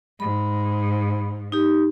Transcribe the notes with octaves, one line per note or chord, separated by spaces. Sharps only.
G#2 B5
D#4 G4